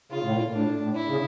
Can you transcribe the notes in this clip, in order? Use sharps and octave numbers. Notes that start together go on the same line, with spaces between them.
C#3 F4
A2
A#2
A2 D4
A2
E4
C#3